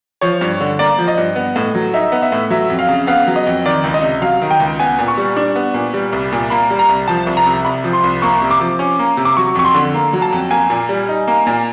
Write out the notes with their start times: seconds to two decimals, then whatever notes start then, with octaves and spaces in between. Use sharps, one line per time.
0.21 F3 C#5
0.41 G2
0.60 D3
0.79 A#3 D5
0.98 F3
1.08 D#5
1.17 G2
1.36 B3
1.56 A2
1.75 F#3
1.94 D#4 E5
2.12 B3
2.22 E5
2.32 A2
2.50 F#3 E5
2.70 F2
2.79 F5
2.89 C#3
3.07 B3 F5
3.27 F#3
3.36 D#5
3.47 F2
3.66 D#3 D5
3.84 C#2
3.94 D#5
4.03 C3
4.22 F#3 F5
4.42 D#3
4.51 G5
4.60 C#2
4.80 B3 G#5
4.99 A#2
5.08 C#6
5.17 G3
5.37 D4
5.56 B3
5.74 A#2
5.94 G3
6.13 C2
6.32 A#2
6.50 A#3 B5
6.70 G3
6.79 A#5
6.89 C2
7.08 F3 A5
7.27 C2
7.37 A#5
7.46 C3
7.65 C2 B5
7.84 F3
7.93 C6
8.04 C2
8.22 A#3 C#6
8.42 C3
8.51 D6
8.60 F3
8.79 C#4
8.99 A#3
9.17 C3
9.25 D6
9.37 F#3 C#6
9.55 F2 C#6
9.65 C6
9.74 D3
9.94 A#3
10.13 F#3
10.22 A5
10.32 F2
10.51 A#3 G#5
10.70 A#2
10.89 G3
11.09 D#4
11.28 A#3
11.47 A#2